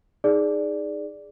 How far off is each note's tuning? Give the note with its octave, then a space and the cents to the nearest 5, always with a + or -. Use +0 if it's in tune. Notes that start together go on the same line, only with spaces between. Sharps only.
D#4 +0 G#4 +0 D5 +0